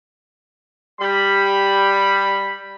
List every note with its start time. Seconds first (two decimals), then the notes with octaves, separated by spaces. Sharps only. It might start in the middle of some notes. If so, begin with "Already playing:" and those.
1.01 G3 B5